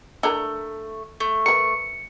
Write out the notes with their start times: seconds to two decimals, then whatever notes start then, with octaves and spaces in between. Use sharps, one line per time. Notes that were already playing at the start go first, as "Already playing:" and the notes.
0.23 A3 D4 E4 A#4
1.20 A3
1.46 A#4 B4 C#7